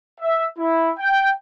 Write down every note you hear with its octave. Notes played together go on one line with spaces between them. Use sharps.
E5
E4
G5